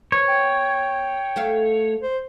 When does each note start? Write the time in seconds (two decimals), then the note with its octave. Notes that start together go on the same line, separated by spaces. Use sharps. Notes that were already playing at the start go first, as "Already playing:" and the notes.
0.12 B3 C#5
0.28 G5
1.36 A3 E5 F5
2.02 C5